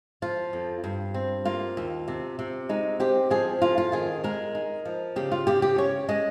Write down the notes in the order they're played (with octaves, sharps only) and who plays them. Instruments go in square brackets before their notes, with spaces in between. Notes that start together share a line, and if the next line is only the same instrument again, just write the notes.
[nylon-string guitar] F3 F4
F2
G2
C4
A#3 F4
D#2
C3
C3
G#3 D#4
C4 G4
F3 G#4
F2 F4
F4
D#3 G#4
G#3 A#4
D#4
F3
C#3 G4
F4
C#3 G4
G4
C#4 C#5
G#3 D#5